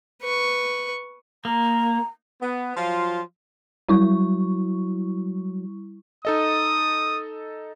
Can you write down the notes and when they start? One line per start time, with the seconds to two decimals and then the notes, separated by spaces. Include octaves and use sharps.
0.22 B4 C#6
1.45 A#3 A#5
2.41 B3
2.76 F3 F#3 F4
3.89 F#3 G3 E4 C#6
6.25 D#4 A4 D#5 D#6